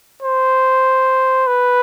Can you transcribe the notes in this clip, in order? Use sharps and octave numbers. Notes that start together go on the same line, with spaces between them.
C5
B4